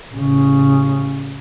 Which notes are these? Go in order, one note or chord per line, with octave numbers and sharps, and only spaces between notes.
A1 C#3